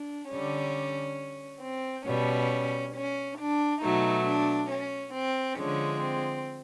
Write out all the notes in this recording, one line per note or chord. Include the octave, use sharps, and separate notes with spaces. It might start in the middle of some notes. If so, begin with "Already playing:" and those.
Already playing: D4
D3 G3 C#4
C4
B2 G3 C#4
C#4
D4
B2 F#3 A3 D#4
D4
C#4
C4
D3 F3 G#3 C#4
C4